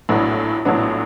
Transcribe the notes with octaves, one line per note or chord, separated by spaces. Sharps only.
A#1 A2 F#3 B3 D4
A#1 A2 F#3 B3 D4